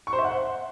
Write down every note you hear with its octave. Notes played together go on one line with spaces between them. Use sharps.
C#6
C5
E5
F#5